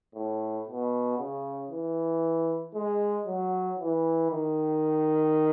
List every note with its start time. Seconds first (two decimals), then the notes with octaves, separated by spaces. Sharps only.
0.15 A2
0.67 B2
1.19 C#3
1.71 E3
2.75 G#3
3.27 F#3
3.79 E3
4.31 D#3